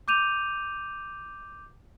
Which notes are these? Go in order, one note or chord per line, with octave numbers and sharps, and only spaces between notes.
D6 G6 D#7 F7